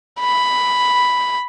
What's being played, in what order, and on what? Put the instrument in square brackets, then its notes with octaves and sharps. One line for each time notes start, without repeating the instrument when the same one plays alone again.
[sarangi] B5